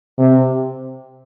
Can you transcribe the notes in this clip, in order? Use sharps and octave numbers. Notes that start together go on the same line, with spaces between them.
C3